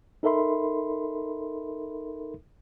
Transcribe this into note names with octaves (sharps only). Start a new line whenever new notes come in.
D#4 A4 A#4 E5 B5 C6